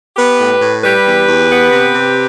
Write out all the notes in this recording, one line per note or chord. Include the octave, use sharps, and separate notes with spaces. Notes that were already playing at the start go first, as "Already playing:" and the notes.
B3 G4 B4
A2
A2
G3 G4 B4
E2
E2
B3
C3
C3